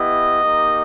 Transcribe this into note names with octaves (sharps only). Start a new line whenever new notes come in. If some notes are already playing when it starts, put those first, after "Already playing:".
Already playing: B3 E4 G4 D#5
A#3 D#4 G4